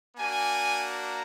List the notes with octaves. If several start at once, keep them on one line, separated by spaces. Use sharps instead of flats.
A#3 D4 F#4 G#5
A#5